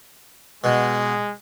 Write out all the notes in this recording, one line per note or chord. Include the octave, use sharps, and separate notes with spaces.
B2 G#3